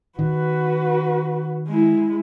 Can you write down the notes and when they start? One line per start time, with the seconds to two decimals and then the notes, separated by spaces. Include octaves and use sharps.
0.19 D#3 F#4 B4
1.67 G#3 E4